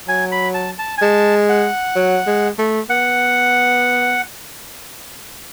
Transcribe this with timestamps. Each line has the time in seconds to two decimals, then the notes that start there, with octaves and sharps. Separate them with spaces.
0.08 F#3 G#5
0.32 B5
0.54 A5
0.79 A5
0.98 G#5
1.02 G#3 A5
1.49 F#5
1.96 F#3
2.27 G#3
2.59 A3
2.90 B3 F#5